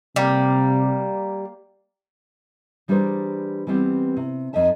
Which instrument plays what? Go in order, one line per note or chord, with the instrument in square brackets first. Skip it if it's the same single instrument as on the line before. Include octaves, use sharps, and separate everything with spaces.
[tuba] C3 [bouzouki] G3 [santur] A#3 F5
[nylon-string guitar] E3 G3 D4 G#4 A#4 C5
E3 G3 B3 C4
C3
F2 D#4 D#5 E5 A5